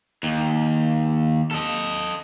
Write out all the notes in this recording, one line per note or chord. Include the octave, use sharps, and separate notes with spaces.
D#2
A4 D#5